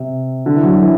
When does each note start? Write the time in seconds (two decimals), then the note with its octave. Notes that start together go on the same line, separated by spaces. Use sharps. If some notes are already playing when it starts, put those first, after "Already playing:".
Already playing: C3
0.46 D3
0.55 E3
0.63 F#3
0.73 F#3
0.81 E3